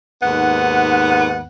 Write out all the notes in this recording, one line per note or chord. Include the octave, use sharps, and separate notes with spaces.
D#2 G#2 B3 F#5